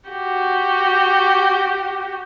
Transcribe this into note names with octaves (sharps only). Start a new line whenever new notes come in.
F#4 G4